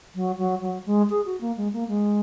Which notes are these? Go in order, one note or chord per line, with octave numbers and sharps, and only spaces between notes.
F#3
F#3
F#3
G#3
G#4
F#4
A#3
G#3
A#3
G#3